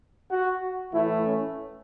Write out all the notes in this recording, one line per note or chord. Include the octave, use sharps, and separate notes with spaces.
F#4
A2 E3 A3 E4
C#4